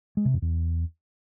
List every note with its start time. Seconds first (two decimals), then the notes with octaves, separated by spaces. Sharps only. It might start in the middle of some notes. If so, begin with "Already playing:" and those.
0.17 G#3
0.25 C3
0.34 F2
0.42 E2